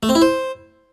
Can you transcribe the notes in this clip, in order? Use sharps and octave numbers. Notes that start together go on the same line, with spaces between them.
A3
C4
E4
C5